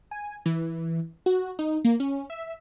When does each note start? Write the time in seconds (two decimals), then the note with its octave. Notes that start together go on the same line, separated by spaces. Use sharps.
0.11 G#5
0.46 E3
1.26 F#4
1.59 D#4
1.85 A#3
2.00 C#4
2.30 E5